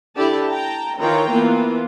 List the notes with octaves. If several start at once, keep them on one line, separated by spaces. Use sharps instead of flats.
D3 E4 G4 D5 A5
G5 A5 A#5
D#3 E3 F4 C#5 G5 A#5
E3 A#3 B3 F4